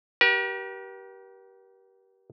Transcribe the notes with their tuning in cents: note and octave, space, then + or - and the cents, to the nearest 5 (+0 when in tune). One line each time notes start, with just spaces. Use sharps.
G4 -25 A#4 +45